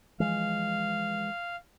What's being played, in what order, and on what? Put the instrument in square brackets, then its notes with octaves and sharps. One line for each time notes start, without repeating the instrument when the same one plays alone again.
[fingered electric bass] E3 F3 G#3 [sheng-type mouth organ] F5